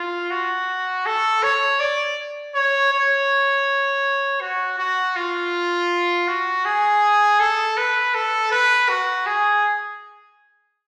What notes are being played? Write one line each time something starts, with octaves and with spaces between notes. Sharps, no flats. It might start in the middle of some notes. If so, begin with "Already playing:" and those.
Already playing: F4
F#4
A4
C#5
D5
C#5
C#5
F#4
F#4
F4
F#4
G#4
A4
B4
A4
B4
F#4
G#4